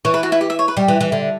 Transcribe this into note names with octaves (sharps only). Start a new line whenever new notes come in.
E3 C#5
B4
F#4
E4
G4
E5
C#5
B4
G3 G4
E3
E3
D3